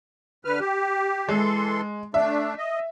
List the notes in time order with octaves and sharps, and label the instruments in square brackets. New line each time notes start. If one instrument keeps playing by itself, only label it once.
[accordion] D3 B4 F6
G4
[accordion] E3 A4 C6 [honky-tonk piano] G#3
[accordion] A3 D4 [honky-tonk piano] E5
[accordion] D#5